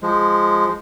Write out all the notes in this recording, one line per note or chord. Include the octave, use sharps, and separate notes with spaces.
F3 G#3